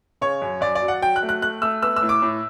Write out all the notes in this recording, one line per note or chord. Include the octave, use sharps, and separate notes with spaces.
C#3 C#5
F#2
F#2 D5
D5
F#3
F#5
F#3 G5
F#6
A3
F#6
A3 F#6
A3 E6
B3 E6
E6
A2
D6
A2